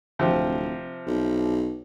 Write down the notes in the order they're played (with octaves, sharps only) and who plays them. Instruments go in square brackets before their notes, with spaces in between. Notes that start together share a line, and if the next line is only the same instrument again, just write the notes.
[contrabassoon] D1 [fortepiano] C3 F3
[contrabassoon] B1